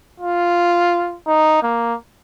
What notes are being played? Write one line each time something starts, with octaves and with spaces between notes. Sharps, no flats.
F4
D#4
A#3